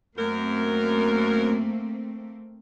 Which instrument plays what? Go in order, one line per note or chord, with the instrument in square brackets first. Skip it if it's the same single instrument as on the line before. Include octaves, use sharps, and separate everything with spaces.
[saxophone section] F#2 A#4 [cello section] A3 A#3 C4